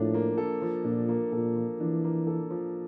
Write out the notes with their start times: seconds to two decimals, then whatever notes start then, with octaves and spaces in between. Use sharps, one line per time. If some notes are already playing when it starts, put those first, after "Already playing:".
Already playing: A2 F3 A#3 D4
0.14 A#3
0.38 A4
0.62 F3
0.84 A#2 D4
1.09 A#3
1.32 A#2 A4
1.56 F3
1.80 E3 D4
2.04 A#3
2.27 A4
2.50 F3